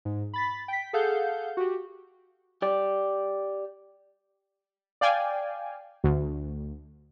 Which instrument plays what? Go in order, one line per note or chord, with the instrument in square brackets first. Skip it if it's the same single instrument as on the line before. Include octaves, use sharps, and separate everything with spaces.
[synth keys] G#2
B5 A6 B6
G5 B6
G#4 A4 F5 F#5 G6
F#4 G4
[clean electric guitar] G4 D5
[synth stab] D5 F5 G5 G#5
D2